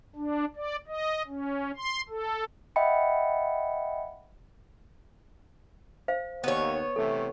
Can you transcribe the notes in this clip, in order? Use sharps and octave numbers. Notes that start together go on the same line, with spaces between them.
D4
D5
D#5
C#4
C6
A4
D#5 E5 F#5 G5 B5 C#7
C5 F5
D#2 B3 C#5
C3 E3 A3 A4